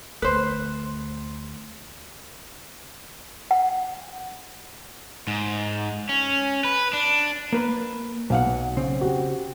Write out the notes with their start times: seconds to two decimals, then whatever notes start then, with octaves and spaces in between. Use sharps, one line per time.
0.22 D2 A3 B4 C5
3.51 F#5
5.27 G#2
6.09 C#4
6.64 B4
6.93 D4
7.53 A#3 B4
8.30 B1 B2 F5 F#5
8.77 C#3 C4
9.01 F#4 G4